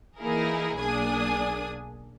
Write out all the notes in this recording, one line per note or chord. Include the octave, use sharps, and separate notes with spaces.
E3 A#3 D#4 E4 G#4 A#4
B1 A#3 D4 G#4 G#5 D#6